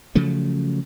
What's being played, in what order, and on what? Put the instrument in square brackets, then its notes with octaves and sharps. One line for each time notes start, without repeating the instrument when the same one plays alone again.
[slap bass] C#3 F3 F#3 A3